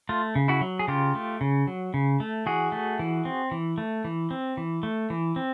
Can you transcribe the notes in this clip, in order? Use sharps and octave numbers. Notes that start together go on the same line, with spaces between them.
A3 F4
C#3
E4 F#4
F#3
G#4
C#3 F4 G4
A3
C#3
F#3
C#3
A3
E3 F#4 G#4
A3
E3
C4
E3
A3
E3
C4
E3
A3
E3
C4